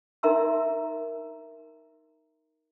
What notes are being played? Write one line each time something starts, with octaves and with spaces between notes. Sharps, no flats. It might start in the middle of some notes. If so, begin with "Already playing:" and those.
D#4 A#4 E5 A#5 C6 E6